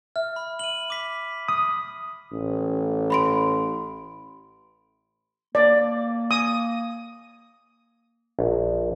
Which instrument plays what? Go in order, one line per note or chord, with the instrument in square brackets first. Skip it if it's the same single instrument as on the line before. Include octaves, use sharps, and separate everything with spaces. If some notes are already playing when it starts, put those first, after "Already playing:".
[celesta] E5 [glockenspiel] F6
[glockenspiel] B5
D#7 F#7
D6 B6
[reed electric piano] D#6
[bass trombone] A1
[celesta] B5 C6 D7
[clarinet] A#3 [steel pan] D5
[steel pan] D#6
[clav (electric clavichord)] A#1